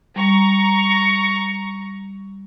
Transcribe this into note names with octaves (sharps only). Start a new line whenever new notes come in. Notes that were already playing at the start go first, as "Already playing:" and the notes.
G3 A#5 C#6